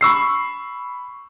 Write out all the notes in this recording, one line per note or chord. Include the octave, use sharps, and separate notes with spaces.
B5 C#6 E6 C7